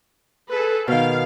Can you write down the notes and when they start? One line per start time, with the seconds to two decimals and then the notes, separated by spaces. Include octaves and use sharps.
0.49 G#4 A4 B4
0.88 B2 D#3 F5